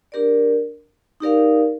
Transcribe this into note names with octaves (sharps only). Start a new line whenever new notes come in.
D4 G4 A#4 D5
D#4 G4 A#4 D5 F5